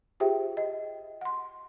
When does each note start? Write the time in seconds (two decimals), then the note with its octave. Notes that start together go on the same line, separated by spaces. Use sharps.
0.20 F4 G4 G#4 C5 E5 G5
0.57 D#5
1.21 F#5 C6